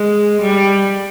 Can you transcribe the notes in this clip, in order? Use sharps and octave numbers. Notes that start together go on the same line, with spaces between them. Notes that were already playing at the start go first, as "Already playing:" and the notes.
Already playing: G#3
G3